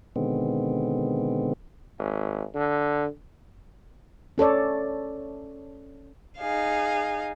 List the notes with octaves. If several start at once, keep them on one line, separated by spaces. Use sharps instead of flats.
B2 D3 D#3 G#3 B3 C4
G#1
D3
C#4 A4 C#5 D5
D#4 G#4 F5